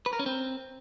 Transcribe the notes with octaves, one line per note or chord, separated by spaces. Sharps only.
B4
A#4
C#4
C4